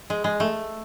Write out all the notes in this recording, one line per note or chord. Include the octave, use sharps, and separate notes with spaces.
G#3
G#3
A3